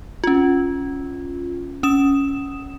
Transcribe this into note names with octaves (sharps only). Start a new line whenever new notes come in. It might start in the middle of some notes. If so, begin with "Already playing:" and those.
C#4 F4
C#4 D#6 E7